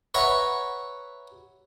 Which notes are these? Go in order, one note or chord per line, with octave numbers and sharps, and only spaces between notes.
B4 C#5 E5 F#5 A#5 C#6